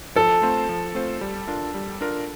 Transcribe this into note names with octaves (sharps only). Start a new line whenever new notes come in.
F3 A4
A3 C4 F4 C5
F3
A3 C4 F4 C5
G3
D4 F4 A#4
G3
D4 F4 A#4